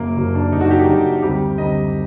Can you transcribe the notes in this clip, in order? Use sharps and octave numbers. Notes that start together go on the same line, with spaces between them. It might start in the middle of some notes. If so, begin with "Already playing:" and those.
Already playing: F#1 F#2 F#3 A#3
F#1 F#2 F#3
D4
F#1 F#2 F#3 D#4
F#4
G4
D#4
F#1 F#2 F#3 F#4
D2 C3 G3 G4
D2 C3 G3 D#5